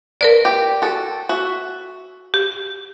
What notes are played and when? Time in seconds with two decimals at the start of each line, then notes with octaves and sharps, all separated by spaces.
0.21 A#4 B4 D5
0.45 G4
0.82 F#4 A4
1.29 F#4 E5
2.34 G4